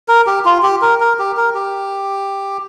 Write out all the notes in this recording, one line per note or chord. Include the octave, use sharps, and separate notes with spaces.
A#4
G4
F4
G4
A#4
A#4
G4
A#4
G4